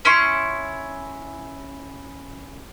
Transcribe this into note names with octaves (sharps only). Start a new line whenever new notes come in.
C#4 E4 C6 C#6